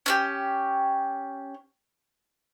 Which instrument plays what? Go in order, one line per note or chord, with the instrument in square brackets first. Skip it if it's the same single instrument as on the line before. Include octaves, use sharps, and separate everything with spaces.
[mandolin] C#4 D4 G4